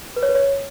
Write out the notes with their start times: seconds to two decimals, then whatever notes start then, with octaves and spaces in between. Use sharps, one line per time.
0.16 B4
0.23 C#5
0.29 B4
0.35 C#5